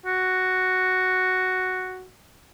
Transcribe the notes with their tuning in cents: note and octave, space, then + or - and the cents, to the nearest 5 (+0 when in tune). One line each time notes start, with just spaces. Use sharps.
F#4 +0